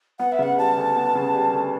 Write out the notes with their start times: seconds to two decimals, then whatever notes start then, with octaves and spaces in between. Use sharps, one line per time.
0.19 B3 F#5
0.32 E5
0.39 C#3 F#5
0.58 G3 A5
0.77 D2
0.96 B3
1.15 C#3
1.34 G3
1.53 D2